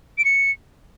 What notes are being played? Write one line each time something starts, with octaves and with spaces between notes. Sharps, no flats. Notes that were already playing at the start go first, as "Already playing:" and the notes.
D7
C#7